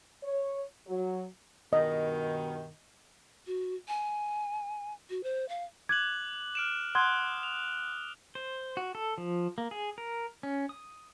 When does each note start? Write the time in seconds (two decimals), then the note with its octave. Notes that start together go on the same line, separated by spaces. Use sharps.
0.23 C#5
0.86 F#3
1.73 G2 B2 D#3 D#5
3.47 F#4
3.88 G#5
5.10 F#4
5.23 C5
5.49 F5
5.89 D6 F#6 G#6 F#7
6.55 F6 D7 E7
6.95 F#5 C6 D#6 F#6 G#6 G7
7.43 F7
8.35 C5
8.77 F#4
8.95 A4
9.18 F3
9.58 A#3
9.71 G#4
9.98 A#4
10.43 C#4
10.69 D#6